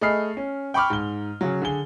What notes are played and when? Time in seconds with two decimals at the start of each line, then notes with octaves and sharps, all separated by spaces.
0.01 A3 G#4 D#5 B5 F6 C7
0.37 C#4
0.74 G5 B5 C#6 D6 F6
0.90 G#2 G7
1.41 C#3 F#3
1.62 D3 G#4 G7